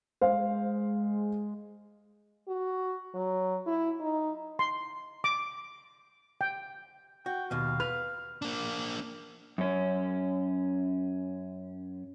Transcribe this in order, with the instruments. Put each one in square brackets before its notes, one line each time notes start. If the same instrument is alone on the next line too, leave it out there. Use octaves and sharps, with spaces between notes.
[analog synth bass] G#3 [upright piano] C5 F5
[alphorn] F#4
F#3
E4
D#4
[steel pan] C6
D6
G5
[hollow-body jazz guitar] F#4 [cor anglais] G5
[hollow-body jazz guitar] D#2 B2 [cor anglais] F5
[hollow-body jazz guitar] B4 [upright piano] F6
[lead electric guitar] A#3 D4
[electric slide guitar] F#2 C#4